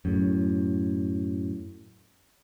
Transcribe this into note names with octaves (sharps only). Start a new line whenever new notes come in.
F#2 A2